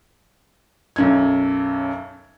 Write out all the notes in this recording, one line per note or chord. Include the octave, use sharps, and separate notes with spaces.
B1 F#2 G#6